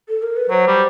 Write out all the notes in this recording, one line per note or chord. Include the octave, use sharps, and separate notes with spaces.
A4
A#4
B4
F#3 C5
G3